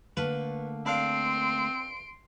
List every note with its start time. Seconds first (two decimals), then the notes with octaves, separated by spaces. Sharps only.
0.17 D3 A3 A#3 B4
0.86 C4 D4 F5 C6 D7